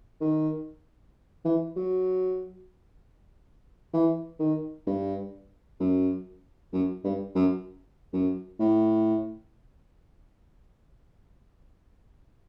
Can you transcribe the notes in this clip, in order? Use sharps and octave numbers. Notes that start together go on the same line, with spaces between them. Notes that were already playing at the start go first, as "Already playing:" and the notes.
D#3
E3
F#3
E3
D#3
G2
F#2
F#2
G2
F#2
F#2
A2